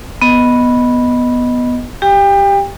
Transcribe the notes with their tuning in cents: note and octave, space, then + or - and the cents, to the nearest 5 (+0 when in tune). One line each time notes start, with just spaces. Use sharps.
B3 -5 D#5 +0
G4 +0 G5 +35